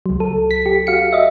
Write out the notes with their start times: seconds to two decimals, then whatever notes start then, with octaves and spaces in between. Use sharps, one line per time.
0.06 C#2 F#3
0.20 A4
0.51 B6
0.66 G4
0.87 F#4 F5 C#7
1.12 D#5 E5